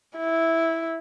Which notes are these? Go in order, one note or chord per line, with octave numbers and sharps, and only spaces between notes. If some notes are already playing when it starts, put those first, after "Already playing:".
E4